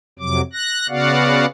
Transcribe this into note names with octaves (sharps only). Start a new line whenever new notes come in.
F2 C3 F#3 D6
F#6 A#6
C#3 B3 F#4 D5 F5 F#5